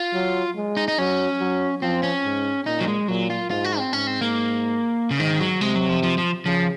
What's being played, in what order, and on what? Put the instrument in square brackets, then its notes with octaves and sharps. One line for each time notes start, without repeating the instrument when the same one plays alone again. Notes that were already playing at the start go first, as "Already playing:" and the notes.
Already playing: [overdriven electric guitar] F4
[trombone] F#3
G#3
[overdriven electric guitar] D#4
D#4
[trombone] F#3 [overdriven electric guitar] C#4
[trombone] F#3
[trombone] F3 [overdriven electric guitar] C4
[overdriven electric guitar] C#4
[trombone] G#2
[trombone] A#2 [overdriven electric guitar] D#4
[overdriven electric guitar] F#3
G#3
[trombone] A#2 [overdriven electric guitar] F#3
[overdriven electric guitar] F4
[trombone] G#2 [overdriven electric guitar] F4
[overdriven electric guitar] F#4
C4
[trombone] G#2 [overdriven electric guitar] C#4
[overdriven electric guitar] C4
A#3
C#3
[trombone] G#2 [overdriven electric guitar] D#3
[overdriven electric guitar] F#3
[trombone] C3 [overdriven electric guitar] G#3
[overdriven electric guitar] F#3
F3
F3
F3
[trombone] C#3 [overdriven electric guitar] F3